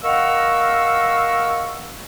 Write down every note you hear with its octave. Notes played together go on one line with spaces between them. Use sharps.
A#4 D#5 F5 F#5 C#6 E6